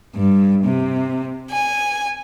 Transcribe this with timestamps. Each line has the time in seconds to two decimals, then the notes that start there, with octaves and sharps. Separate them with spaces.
0.15 G2
0.64 C3
1.51 G#5